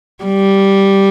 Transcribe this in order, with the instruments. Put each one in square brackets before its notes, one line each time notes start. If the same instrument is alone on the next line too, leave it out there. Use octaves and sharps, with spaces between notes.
[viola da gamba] G3